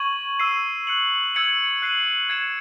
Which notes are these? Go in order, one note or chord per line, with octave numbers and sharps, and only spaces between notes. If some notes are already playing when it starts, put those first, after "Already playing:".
Already playing: C#6 G#6 D#7 F#7
E6 C7 D#7
F#6 C#7 F#7
E6 G#6 C#7 F#7
F#6 C7 D#7 F#7
G#6 C#7 E7